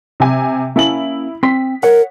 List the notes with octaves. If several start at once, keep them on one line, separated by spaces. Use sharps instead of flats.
C3 G#5
A#3 C#4 E4 A5 F#7
C4 C6 B6
A#4 C#5 F#5